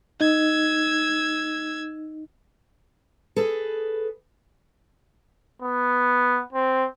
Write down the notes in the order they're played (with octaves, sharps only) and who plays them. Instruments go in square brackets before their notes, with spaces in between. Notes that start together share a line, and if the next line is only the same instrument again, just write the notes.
[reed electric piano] D#4 D#5 [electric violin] E6 G#6
[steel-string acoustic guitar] G#4 A4 B4
[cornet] B3
C4